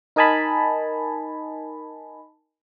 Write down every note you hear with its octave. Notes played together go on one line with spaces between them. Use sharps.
D#4 A#4 D#5 G#5 A5 B5